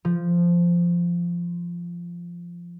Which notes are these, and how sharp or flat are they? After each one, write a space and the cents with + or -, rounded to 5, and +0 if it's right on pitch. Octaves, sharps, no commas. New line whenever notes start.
F3 -10